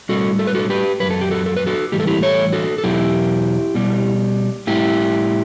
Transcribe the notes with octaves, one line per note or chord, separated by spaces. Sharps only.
A2 G3 F#4 A4
A4
B4
F#4 A4
G4 B4
F#2 C#3 F#3 B4
A4
G4
F#4 A4
A4
B4
F#4 A4
A2 E3 G3 G4
A4
E4 G4
A4 C#5
F#4 A4
A4
E2 B2 F#3 E4 G4
B2 G3
A2 G3 E4 G4